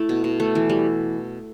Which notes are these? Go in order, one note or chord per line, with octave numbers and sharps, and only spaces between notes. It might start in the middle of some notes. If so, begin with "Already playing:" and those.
Already playing: A3 E4
B2
B2
A3
E3
G3